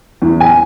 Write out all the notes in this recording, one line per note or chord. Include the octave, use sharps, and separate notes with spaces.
E2
G#5